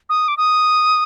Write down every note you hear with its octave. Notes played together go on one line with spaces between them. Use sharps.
D#6
D6
D#6